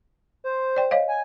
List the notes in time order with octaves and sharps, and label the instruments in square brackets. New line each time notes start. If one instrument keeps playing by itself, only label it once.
[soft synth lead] C5
[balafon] D5 G5
C#5 D#5 F5
[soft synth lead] G#5